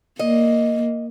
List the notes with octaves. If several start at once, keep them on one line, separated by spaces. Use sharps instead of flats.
A#3 D#5